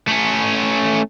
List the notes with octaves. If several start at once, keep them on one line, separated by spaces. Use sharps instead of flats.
A3 C#4